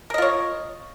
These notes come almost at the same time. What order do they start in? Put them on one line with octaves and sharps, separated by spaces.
A#4 D#5 F4 C#5